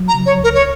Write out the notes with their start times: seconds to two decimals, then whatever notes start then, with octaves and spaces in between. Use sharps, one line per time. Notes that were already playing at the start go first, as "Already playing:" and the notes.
Already playing: F#3
0.08 A#5
0.14 C#3
0.26 C#5
0.38 C#2
0.44 A#4
0.54 C#5